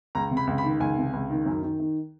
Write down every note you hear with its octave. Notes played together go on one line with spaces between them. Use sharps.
C#2 A#5
C3
B5
C#2
B5
D#3
C#2 G#5
C3
C#2
D#3
F#2
D#3
D#3